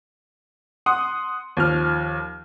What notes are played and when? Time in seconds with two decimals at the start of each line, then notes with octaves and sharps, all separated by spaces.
0.86 F#5 C6 D#6
1.57 D#2 F3 F6